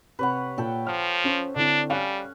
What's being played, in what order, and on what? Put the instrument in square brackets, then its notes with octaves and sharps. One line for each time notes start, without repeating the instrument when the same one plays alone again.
[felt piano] C3 [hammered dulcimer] B4 C#5 F#5
[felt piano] A#2 [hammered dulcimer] A4 G5 A5
[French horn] F3 [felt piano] F6
[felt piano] C#4 C5
[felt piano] D3 C4 E4 [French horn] D4
[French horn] G3 [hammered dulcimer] C#4 [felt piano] F5 F#6